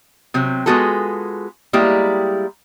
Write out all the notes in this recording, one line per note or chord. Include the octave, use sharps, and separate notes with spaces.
C3 F#3 C4
G#3 B3 F4 F#4 G#4 A4
G3 G#3 A#3 E4 G4